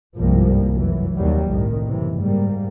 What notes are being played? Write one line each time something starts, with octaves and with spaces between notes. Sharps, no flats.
G1 C2 G#2 F3 G3 A#3
F1 F#2 E3 F#3
D#2 C3 F#3 G3
G1 C2 A2 D#3
F#1 C3 E3
G#2 G3 A#3